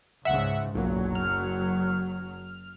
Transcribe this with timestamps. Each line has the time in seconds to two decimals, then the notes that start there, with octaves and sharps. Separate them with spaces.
0.25 C#2 G#2 C#3 E5 F#5
0.75 F#1 B1 A#2 F#3
1.15 F6